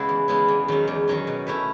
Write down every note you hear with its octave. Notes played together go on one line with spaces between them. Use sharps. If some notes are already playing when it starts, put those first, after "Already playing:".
Already playing: C#3 G#3 B3 E4 F#4
E2
C#3 G#3 B3 E4
E2
D#3 F#3 C#4
E2
D#3 F#3 C#4
B2
A3 C#4 E4 B4